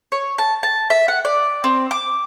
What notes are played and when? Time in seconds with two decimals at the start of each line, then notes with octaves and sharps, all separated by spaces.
0.12 C#5
0.38 A5
0.63 A5
0.90 E5
1.08 F#5
1.25 D5
1.64 C4
1.91 D6